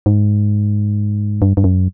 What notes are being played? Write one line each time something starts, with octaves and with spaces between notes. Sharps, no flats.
G#2
G2
G2
F#2